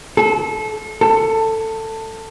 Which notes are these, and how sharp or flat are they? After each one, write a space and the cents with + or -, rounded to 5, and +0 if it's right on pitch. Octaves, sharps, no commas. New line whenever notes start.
A4 -25
A4 +15